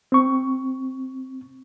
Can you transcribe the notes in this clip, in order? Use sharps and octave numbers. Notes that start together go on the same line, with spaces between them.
C4 C#6